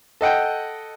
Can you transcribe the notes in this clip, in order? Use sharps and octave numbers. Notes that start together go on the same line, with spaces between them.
A4 D#5 F#5 G5